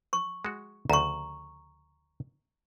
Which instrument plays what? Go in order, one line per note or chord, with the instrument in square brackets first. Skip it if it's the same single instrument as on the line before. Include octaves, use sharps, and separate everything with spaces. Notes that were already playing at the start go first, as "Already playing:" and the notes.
[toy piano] C#6
[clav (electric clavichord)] G#3 F#4
[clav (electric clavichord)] D2 C#3 [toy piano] A#5 C#6